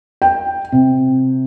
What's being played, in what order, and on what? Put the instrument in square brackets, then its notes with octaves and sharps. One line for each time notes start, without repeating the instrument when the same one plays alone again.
[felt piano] G5
C3